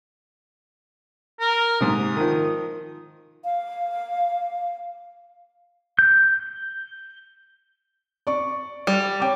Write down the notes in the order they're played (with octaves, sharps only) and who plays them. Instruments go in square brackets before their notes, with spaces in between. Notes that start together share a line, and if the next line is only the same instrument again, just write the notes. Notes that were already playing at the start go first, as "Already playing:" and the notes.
[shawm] A#4
[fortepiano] G#2 C3 [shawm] D#6
[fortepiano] D#3 F3
[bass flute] F5
[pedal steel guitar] G6
[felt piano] D5 C#6
[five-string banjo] G3
[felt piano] C#5 G5 D6